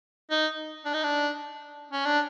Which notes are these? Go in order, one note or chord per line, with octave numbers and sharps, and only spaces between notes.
D#4
D4
D#4
D4
C#4
D4